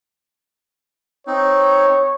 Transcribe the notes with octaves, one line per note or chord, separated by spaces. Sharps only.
C4 D#4 C#5